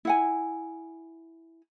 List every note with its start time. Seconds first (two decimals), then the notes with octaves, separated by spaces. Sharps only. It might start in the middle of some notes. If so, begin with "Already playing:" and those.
0.05 E4 F#5 G#5